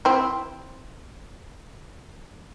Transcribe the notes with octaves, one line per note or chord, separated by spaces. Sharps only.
C4 E4